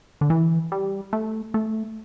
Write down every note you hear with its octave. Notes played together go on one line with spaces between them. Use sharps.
D3
E3
G3
A3
A3